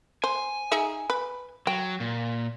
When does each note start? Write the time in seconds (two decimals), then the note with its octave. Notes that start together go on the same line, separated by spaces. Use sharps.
0.24 C5 G#5
0.71 D#4 G#4 E5
1.10 B4
1.67 F#3 G5
2.00 A#2